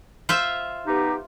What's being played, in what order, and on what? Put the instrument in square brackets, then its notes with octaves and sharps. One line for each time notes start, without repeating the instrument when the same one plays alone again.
[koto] F4 C5 E5
[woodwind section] B3 D#4 G4